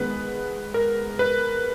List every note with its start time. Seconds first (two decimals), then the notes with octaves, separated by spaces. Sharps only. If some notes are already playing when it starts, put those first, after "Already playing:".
Already playing: D#3 G#3 B3 B4
0.74 A#4
1.19 B4